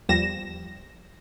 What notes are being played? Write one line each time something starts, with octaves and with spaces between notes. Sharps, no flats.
E2 F3 G3 A#6 E7